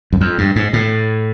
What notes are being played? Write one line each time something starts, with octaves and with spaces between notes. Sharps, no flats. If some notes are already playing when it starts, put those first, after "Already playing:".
F#2
F2
G2
G#2
A2